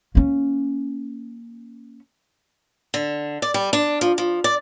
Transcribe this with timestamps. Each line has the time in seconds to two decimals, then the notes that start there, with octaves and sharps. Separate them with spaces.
0.15 A#3 C#4
2.94 D3
3.42 D5
3.54 G3
3.73 D4
4.01 F3
4.18 F3
4.44 D5